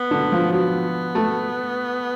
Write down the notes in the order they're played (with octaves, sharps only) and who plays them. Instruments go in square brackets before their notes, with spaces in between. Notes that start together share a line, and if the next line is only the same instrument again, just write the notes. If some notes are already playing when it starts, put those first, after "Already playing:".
Already playing: [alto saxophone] B3
[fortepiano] D3
F3
[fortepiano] F#3 [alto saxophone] B3
[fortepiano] A3